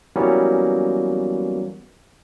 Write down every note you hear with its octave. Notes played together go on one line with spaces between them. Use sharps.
E3 F#3 G3 A#3 B3 C#4